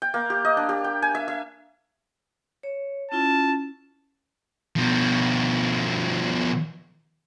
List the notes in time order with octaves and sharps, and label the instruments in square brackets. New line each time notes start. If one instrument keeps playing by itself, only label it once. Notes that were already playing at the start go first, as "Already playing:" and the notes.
[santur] G5
A#3
G4
D#5
D4
G4
G5
G#5
E5
E5
[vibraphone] C#5
[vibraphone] C#4 E4 F4 [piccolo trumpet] A5
[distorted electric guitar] B2 F3